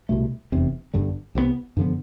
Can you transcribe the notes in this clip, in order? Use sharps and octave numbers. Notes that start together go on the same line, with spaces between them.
C2 B2 A3
F1 E2 C3
G1 G2 D3 G3
C2 C3 F3 B3
G2 D3 F3 B3